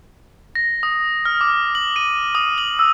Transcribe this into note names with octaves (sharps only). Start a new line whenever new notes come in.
A#6
D#6
F6
D6
F#7
D#7
D#6
F#7
E6